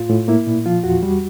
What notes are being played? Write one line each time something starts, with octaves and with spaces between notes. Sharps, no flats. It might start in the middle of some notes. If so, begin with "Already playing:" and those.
Already playing: A2 F4
A2
A#3 E4
A#2
F3 F4
E2 F#4
G3